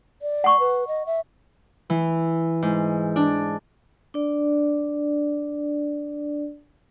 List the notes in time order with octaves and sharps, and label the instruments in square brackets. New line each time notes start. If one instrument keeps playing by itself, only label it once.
[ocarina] D5
[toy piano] F#5 C#6
[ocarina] B4
D#5
E5
[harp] E3
G#2
D4
[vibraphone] D4 D5